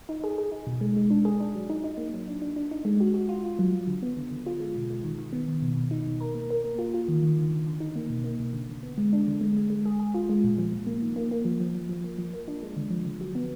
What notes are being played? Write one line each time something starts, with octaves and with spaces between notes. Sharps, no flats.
D#4
G#4
G#4
D#4
B2
G#3
G#3
D4
G#4
D4
F#3
D#4
D#4
A#3
F#3
D4
D4
D4
D#4
G#3
F#4
F#4
F4
F4
F#3
F#3
D3
B3
D3
D3
F4
G#3
B2
G#3
D#3
D#3
B3
D#3
B2
B2
D#4
B2
A#4
A#3
A#4
A#3
F4
F4
D#3
D#3
D3
D3
D3
D#4
A#3
B2
A#3
B2
D3
D3
B3
G#3
D4
D3
G#3
G#3
G#3
G#4
G#4
F4
G#3
A#2
F3
A#2
A#3
D#3
A#3
A#3
F3
F3
F3
F3
A#3
F3
A#3
D4
G#3
D3
F3
D3
F#3
B3